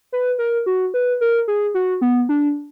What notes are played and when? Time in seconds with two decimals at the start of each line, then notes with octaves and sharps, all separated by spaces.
0.12 B4
0.39 A#4
0.66 F#4
0.94 B4
1.21 A#4
1.48 G#4
1.74 F#4
2.01 B3
2.29 D4